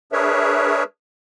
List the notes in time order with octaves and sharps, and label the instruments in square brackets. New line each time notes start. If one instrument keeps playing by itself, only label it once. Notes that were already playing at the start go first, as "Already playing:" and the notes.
[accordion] D4 G#4 A#4 B4 C#5 E5